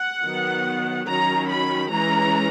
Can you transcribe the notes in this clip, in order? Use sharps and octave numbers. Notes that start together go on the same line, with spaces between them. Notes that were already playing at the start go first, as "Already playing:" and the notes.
Already playing: F#5
D#3 F#3 B3
D#3 F#3 C#4 A#5
B5
E3 G#3 C#4 A#5